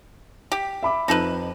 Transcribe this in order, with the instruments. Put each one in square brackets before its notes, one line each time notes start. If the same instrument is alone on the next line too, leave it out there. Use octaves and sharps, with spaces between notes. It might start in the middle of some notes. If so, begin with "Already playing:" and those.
[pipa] G4
[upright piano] E5 B5 D6
[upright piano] F2 [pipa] D#4 A4 B4